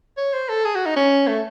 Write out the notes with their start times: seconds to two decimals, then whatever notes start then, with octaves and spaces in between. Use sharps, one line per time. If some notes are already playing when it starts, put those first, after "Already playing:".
0.17 C#5
0.33 C5
0.49 A4
0.65 G#4
0.75 F#4
0.86 D#4
0.96 C#4
1.28 A3